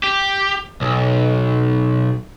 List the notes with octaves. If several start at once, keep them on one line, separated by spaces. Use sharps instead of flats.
G4
B1